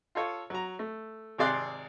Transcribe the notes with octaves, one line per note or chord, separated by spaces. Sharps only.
F4 A4 C#5
F#3 A#5
A3
G#1 C3 G#4 D5 C6 F#6